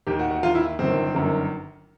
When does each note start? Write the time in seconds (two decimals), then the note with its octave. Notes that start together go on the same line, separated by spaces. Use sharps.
0.07 D#2 D#3 G4
0.19 F#4
0.31 F#4
0.43 D#2 D#3 F4
0.55 E4
0.79 G1 F#2 D#3 C4
1.15 G1 F#2 D#3